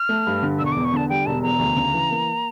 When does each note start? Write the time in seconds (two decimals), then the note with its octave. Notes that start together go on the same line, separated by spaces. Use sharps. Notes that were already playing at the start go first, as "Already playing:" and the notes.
Already playing: F6
0.09 A3
0.26 G2
0.43 D3
0.59 E1 E6
0.66 C#6
0.72 E2 D6
0.85 C#6
0.93 D3 A5
1.09 G3 G5
1.26 E1 A5
1.43 E2 A#5
1.59 D2
1.76 C#3
1.94 E3
2.11 A#3